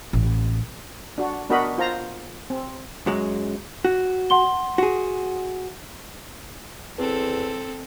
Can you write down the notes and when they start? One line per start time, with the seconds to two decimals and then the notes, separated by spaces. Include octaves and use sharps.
0.13 A1
1.18 D4 F#4
1.50 B3 D4 F#4 A#4 D#5 B5
1.78 F4 C5 A#5
2.50 C4
3.06 F#2 F#3 G#3
3.85 F#4
4.30 F#5 C6 G7
4.78 F#4 G#4
6.98 E2 C4 A4